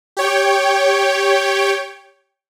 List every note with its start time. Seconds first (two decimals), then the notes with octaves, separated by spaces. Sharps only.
0.17 G4 C#5 G5